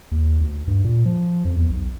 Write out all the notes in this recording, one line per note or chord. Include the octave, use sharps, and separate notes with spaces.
D#2
D2
G2
A#2
F3
F2
E2
B1